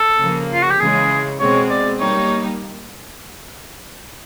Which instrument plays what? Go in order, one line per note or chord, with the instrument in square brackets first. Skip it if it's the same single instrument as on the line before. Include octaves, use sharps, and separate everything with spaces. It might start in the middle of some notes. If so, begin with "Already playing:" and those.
Already playing: [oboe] A4
[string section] C#3 F3 A#3
[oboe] F4
F#4
G4
[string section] C#3 E3 G#3 [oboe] G#4
[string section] B2 G#3 C4 [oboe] C#5
[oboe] D5
[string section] G3 A#3 D#4 G4 [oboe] C#5